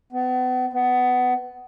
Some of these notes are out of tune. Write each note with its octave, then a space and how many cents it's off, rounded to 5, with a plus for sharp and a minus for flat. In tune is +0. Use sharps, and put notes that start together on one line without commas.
B3 +40
B3 +20